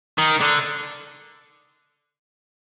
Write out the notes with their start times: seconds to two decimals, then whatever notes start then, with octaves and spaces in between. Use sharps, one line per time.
0.18 D#3
0.41 D3